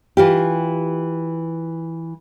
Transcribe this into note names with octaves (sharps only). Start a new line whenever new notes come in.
E3 F4 G4